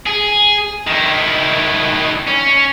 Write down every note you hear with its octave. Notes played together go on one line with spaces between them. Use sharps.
G#4
D#3 E4
C#4